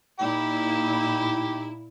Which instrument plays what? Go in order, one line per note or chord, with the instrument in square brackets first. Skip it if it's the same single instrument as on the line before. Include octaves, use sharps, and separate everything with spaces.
[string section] A#2 E4 [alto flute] D#4 [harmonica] G4